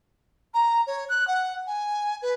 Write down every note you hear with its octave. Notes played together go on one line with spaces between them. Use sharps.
A#5
C#5
F#6
F#5
G#5
B4